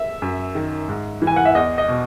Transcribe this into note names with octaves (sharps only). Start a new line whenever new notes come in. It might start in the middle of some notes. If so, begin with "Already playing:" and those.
Already playing: E5
F#2
D#3
G#2
E3
G#5
F#5
E5
E2 D#5
D#5
B2